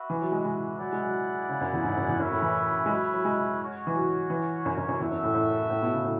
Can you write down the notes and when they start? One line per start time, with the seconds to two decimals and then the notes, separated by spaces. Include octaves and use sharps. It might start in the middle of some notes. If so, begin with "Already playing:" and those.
Already playing: F#4 B4 E5
0.10 E3
0.21 F#3
0.32 G#3
0.45 G#3
0.79 F#3 E4 G#4 D5 F#5
0.93 G#3
1.05 F#3
1.49 C#3
1.61 F#2
1.73 E2
1.85 G#2
1.97 F#2
2.08 E2
2.19 F#2 C#4 E4 B4 E5
2.32 A2
2.42 E3
2.86 G#3
2.89 F#3
3.14 F#3
3.25 G#3
3.60 C#4 F#4 C#5
3.87 E3
3.95 F#3
4.30 E3
4.66 F#2
4.77 F#2
4.89 F#2
5.00 E2 F#4 A4 E5
5.11 F#2
5.24 A2
5.34 A2
5.70 A2
5.82 B2
5.93 C#3
6.05 A2